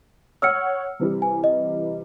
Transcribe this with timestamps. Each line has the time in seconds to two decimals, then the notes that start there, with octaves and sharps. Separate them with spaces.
0.42 C#5 F#5 E6 F6 C#7
1.00 C3 E3 G3
1.22 G#5
1.44 D#5